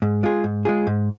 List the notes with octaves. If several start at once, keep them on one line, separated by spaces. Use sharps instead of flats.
G#2
G#3 F4 G#4
G#2
G#3 F4 G#4
G#2